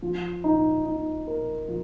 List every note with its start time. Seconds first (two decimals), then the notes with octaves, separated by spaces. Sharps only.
0.02 F3
0.44 D#4
0.85 D#4
1.27 A#4
1.68 F3